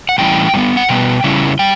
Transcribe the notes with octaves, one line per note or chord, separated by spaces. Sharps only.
F#5
A2 E3 G3 C#4 E4 G5
A2 G3 B3
F#5
B2 G3 B3 G5
C#3 G3 C#4 E4
G3 G5